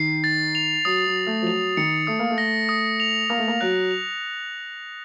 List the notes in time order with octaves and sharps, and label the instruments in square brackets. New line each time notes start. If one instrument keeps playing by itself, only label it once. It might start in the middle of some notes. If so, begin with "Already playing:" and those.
Already playing: [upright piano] D#3 [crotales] C7
[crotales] A6
F7
[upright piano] F#3 [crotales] D#6
[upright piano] F#3
[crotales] A#6
[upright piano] A3
F3
[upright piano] F#3 [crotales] F7
[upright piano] D#3 [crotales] C#7
[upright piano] A3 [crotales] D#6
[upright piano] A#3
A3
[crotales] A#6
D#6
F7
[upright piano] A#3 [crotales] D#6
[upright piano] A3
A#3
[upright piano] F#3 [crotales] F#6
[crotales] F7